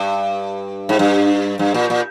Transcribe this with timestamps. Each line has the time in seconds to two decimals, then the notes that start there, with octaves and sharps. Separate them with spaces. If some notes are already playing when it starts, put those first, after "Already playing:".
Already playing: G2
0.89 G#2
0.99 G2
1.59 G2
1.74 A#2
1.90 A#2